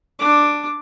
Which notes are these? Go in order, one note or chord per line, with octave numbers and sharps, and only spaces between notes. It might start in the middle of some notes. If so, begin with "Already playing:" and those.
D4 D6